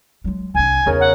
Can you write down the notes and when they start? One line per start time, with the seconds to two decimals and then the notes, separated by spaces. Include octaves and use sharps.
0.24 F#3 G#3
0.55 C2 D4 G#5
0.86 E2 C#3 D#4 A#4
1.00 F#5